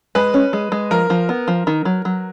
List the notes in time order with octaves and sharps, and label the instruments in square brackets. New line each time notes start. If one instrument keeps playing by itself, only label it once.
[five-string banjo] G#3 [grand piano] B4
[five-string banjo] C#4
G#3
G#3
[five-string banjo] F3 [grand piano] A#4
[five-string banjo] F3
B3
F3
D#3
F#3
F#3